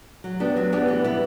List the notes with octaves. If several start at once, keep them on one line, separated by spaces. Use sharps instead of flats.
F#3
B3 D4 G4
F#3
B3 D4 G4
E3
G3 B3 E4